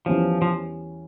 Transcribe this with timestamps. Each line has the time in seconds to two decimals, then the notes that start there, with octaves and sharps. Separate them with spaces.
0.06 E2 E3 F3 G3 C#4
0.42 F3